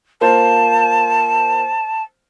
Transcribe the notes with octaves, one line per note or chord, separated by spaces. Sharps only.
A#3 F4 C5 A5